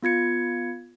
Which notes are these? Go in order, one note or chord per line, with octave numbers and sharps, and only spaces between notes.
B3 F4 G#6 C#7